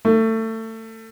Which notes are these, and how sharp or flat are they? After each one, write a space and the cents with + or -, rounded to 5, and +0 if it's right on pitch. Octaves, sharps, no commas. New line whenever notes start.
A3 +25